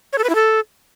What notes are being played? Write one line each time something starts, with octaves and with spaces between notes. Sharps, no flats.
C#5
A4
B4
E4
A4